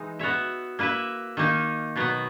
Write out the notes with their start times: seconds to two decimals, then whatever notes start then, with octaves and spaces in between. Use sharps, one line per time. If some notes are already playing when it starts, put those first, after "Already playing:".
Already playing: E3 G#3 D#4
0.19 B3 F#4 C#5 E5
0.79 A#3 E4 B4 E5
1.37 D#3 A#3 D#4
1.96 B2 F#3 B3